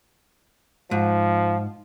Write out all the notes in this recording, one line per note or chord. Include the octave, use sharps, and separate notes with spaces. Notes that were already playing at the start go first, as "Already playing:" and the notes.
G#2 F3